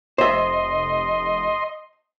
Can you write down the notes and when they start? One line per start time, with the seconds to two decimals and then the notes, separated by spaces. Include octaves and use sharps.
0.18 F1 C5 D#5 E5 C6